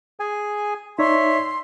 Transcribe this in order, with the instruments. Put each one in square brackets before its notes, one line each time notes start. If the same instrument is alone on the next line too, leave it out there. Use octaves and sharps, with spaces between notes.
[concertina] G#4 G#5
[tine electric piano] D#4 D5 [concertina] C#5 E5 [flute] C6